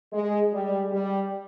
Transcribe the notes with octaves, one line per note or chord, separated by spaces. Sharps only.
G#3
G3
G3